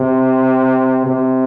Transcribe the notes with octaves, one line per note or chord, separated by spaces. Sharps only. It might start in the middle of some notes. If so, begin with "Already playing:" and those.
Already playing: C3
C3